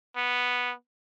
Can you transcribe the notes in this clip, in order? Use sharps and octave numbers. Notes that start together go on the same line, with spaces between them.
B3